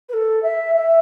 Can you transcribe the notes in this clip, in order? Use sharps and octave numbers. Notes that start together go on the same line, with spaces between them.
B4
A4
E5
E5